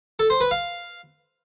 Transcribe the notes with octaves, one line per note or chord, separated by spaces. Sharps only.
A4
C5
B4
F5